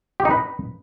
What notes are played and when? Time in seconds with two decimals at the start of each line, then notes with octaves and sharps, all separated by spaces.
0.20 G4
0.25 D#4
0.31 B4